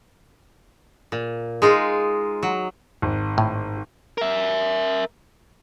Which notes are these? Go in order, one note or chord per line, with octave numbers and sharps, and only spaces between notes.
A#2
G#3 D#4 F4
F#3
G#1
A2
A#4 E5